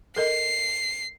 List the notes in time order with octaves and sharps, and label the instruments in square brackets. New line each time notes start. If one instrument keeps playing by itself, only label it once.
[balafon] A4 A#4 D#5 [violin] C7